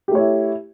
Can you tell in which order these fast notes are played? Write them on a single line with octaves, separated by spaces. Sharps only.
G4 A3 C#5 E4